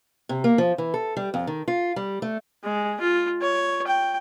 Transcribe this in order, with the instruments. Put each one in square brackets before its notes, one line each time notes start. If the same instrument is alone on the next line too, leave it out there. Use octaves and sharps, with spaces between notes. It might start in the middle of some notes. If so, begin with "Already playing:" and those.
[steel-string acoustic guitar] C3
A#3
F3
E3
A4
G3
F2
D#3
F4
G3
A3
[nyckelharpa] G#3
F4
C#5
G5